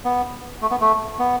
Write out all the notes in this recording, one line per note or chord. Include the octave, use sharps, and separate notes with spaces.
B3
A3
B3
A3
B3